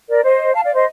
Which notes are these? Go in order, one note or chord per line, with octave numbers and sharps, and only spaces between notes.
A#4 D5
C5 D#5
F5 A5
D5 F5
C5 D#5